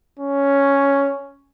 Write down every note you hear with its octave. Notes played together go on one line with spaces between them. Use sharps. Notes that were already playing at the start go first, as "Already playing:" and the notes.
C#4